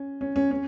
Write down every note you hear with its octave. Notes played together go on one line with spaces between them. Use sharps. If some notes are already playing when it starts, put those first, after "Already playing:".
Already playing: C#4
C#4
C#4
C#4